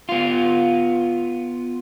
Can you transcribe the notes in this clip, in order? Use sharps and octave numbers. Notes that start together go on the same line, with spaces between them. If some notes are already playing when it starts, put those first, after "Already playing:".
B3 F4